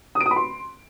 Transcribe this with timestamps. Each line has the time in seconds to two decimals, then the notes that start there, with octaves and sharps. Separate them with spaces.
0.15 D#6
0.21 D7
0.26 D#6
0.31 B5
0.36 C6